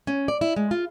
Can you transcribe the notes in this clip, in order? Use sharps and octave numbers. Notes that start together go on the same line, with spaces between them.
C#4
D5
E4
G#3
F4